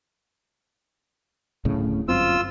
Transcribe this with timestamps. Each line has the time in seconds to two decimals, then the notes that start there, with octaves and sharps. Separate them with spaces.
1.65 D1 A2 C#3
2.08 G1 F#2 C4 F4 E6